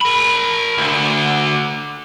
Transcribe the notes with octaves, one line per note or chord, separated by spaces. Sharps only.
A#4 B5
D2 D3